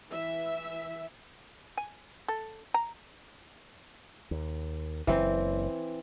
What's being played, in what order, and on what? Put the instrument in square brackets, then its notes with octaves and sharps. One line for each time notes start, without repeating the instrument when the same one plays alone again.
[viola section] E3 E5
[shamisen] G#5
A4
A#5
[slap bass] D#2
[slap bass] F#1 [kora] E3 C4